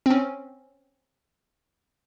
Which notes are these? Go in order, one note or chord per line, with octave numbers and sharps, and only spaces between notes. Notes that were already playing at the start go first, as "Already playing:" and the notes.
C4 C#4